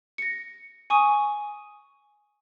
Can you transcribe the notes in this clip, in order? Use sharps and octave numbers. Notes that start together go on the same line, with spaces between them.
A#6 C#7
G#5 C#6 D#6